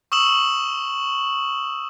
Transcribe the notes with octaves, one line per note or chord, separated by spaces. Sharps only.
C#6 D#6 E6 E7 F#7